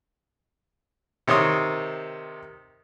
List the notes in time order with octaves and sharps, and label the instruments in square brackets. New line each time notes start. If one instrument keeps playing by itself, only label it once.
[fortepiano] C3 D#3 C#5 C6 D#6